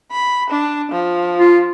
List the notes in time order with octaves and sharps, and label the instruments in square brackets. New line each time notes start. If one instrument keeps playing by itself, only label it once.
[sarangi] B5
D4
F3
[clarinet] F4